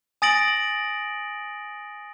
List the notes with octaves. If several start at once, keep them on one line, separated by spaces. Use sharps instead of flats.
G#5 D#6 A6 A#6 D7 F#7